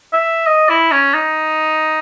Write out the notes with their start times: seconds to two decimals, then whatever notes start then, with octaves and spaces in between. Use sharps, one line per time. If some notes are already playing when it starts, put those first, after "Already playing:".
0.13 E5
0.47 D#5
0.70 E4
0.92 C#4
1.14 D#4